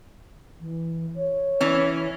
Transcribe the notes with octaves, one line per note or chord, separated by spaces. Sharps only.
E3
C#5
E3 C#4